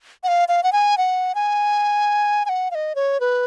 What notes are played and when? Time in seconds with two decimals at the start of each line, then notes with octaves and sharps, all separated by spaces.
0.24 F#5
0.28 F5
0.48 F5
0.63 F#5
0.73 G#5
0.98 F#5
1.35 G#5
2.45 G#5
2.49 F#5
2.71 F5
2.75 D#5
2.95 C#5
3.20 B4